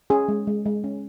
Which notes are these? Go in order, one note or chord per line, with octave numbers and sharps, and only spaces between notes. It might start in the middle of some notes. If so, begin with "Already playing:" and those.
C#4 G#4
G#3
G#3
G#3
C#4